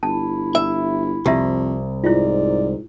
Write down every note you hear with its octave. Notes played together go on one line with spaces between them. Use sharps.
G1 E4 A5
E5
C2 F2 G4 E5
G#2 E4 F4 D5